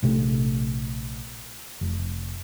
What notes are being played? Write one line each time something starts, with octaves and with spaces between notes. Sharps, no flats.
A#1 C3 A3
F1